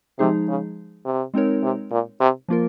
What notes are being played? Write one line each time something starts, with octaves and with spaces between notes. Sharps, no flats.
C3 F3 G#3 D#4 G#4
C#3
C3
G#3 C4 D#4 A#4 C#5
C3
A#2
C3
F3 A#3 F4 A#4